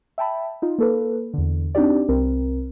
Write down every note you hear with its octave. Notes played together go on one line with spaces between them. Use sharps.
E5 G5 A5 B5
D#4 F4
A#3 A4 B4
E2 D3
C4 D4 D#4 F#4 G4 D5
C2 C4 A#4